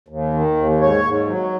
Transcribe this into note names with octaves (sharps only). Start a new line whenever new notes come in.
D#2
D#3
D#2
G#2 C#5
G#2
F#3